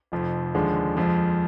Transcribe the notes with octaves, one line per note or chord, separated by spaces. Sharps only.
F1 F2 F3
D#2 D3 F3 G#3
F2 F3 G#3